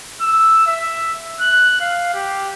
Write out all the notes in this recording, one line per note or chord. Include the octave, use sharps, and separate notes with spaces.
E6
E5
F#6
F5
G4